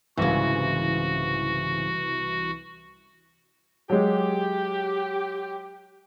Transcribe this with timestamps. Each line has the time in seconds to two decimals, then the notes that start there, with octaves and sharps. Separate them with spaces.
0.17 C2 G#2 C#3 E3 F#4
3.90 F#3 G#3 G4